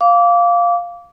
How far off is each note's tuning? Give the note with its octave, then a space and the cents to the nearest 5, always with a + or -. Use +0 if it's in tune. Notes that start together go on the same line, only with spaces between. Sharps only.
F5 +0 D6 -25